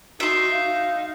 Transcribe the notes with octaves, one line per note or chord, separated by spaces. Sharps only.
D#4 F#4 E5 C6
F5